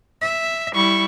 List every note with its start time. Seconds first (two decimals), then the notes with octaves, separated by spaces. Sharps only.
0.21 E5
0.75 G3 E4 C#6